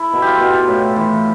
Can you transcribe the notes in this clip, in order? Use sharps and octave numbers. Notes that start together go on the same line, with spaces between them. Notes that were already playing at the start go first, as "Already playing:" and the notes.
Already playing: E4 A4
B2
F4 G4
B2
A2
E3